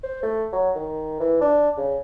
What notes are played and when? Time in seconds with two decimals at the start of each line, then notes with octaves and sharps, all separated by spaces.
0.04 C5
0.23 A3
0.53 F#3
0.76 D#3
1.20 E3
1.41 D4
1.78 C#3